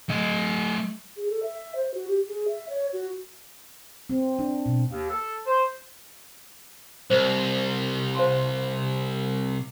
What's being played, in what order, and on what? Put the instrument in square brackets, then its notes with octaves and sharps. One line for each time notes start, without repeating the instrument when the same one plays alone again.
[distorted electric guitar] A3 D#5
[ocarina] G#4
A4
E5
C5
F#4
G4
G#4
E5
C#5
F#4
[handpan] C4
D4
B2
[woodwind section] D#2
A4
C5
[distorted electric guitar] C2 [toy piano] C5
[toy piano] C5 F5 C6